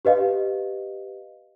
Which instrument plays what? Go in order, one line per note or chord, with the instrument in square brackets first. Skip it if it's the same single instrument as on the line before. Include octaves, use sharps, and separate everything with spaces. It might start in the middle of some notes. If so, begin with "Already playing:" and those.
[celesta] G4 B4 D#5 F5